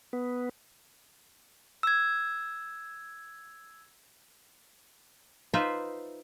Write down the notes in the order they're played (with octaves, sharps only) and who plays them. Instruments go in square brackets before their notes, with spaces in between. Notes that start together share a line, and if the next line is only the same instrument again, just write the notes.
[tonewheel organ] B3
[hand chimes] E6 G#6
[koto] D#4 F4 B4 C5 E5